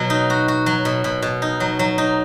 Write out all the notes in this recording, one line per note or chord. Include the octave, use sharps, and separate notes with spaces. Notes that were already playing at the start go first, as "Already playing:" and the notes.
Already playing: B2 F#3
D#4
F#4
F#4
F#3
B2
B2
B2
D#4
F#3
F#3
D#4